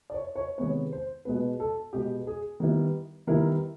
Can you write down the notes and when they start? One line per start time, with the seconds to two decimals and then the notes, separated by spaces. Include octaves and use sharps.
0.10 D5
0.14 C#5
0.35 C#5
0.58 C3 D#3 G#3 B3 C#5
0.92 C5
1.25 B2 G#3 B3 B4
1.60 A4
1.93 B2 G#3 B3 G4
2.27 G#4
2.60 D#3 G3 B3 E4
3.27 D#3 G3 B3 E4 A#4